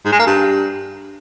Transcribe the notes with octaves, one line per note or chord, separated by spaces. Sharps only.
G#2
G#3
A#3
G2